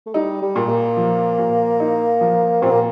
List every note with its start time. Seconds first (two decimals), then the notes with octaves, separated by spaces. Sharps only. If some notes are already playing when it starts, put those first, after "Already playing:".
0.06 A3
0.14 G3 D#4
0.42 G3
0.56 A#2
0.69 A#3
0.97 F3
1.38 A#2
1.80 D#4
2.21 F3
2.62 A#2 C4
2.71 A#3